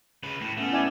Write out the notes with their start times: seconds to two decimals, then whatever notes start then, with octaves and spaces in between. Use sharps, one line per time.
0.23 C#3 B4
0.41 A2
0.57 A3 B3 C#4
0.72 E4 D5 G#5